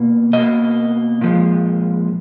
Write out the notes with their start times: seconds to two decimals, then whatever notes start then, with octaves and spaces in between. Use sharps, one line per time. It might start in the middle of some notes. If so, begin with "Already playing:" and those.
Already playing: B2 A#3
0.33 B2 A#3 D#5
1.21 A#2 F3 G#3